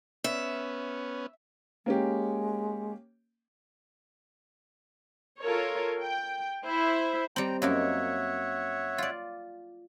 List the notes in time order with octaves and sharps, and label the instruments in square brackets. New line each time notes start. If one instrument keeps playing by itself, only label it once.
[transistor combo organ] B3 C#4 [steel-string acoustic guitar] E5
[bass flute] G#3 [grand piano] A#3 C#4 G4
[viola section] F4 A4 A#4 C#5
G5
E4 C5 E5
[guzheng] G3 C4 [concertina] G5 A#5
[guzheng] F#2 A#3 D#4 [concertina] C#5 E5 F#5
[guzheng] F4 D5